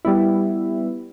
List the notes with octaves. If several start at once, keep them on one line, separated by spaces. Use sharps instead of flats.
G3 B3 E4